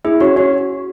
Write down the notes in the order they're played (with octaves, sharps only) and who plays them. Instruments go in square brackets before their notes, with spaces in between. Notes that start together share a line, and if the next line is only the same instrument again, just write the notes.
[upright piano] E4 [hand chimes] G#4
[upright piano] C#4 [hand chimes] F#4
[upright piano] C#4 [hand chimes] F#4